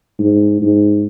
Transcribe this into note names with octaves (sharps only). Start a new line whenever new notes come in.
G#2
G#2